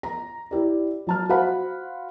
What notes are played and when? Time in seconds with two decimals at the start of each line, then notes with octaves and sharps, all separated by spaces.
0.03 A#5
0.51 E4 G4 D5
1.07 F#3 A5 F6
1.29 F#4 C5 F5 F#5 B5